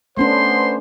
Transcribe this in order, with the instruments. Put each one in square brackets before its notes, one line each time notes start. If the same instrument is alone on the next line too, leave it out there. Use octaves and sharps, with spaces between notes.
[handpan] A3 C#4 D4 [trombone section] B3 C5 [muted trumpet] C6